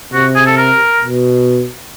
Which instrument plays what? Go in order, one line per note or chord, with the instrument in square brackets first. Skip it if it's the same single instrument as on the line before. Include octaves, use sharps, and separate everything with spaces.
[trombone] C3 [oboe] F#4
[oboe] G#4
A4
A#4
[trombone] B2